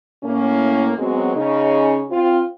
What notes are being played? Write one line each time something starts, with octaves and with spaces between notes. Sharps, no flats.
A2 A#3 C#4
F#2 F#3 G#3 B3 C4
C#3 C#4 D#4
C4 F4